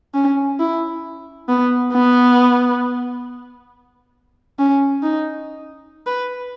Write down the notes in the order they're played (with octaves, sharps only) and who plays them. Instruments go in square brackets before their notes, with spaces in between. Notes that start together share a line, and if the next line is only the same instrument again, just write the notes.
[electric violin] C#4
E4
B3
B3
C#4
D#4
B4